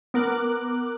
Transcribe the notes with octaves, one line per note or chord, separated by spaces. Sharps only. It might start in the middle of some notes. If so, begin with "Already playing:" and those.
B3 A#4 D6 F#6